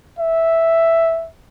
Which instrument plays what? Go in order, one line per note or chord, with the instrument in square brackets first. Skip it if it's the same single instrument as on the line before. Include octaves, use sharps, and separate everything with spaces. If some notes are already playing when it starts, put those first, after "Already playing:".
[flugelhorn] E5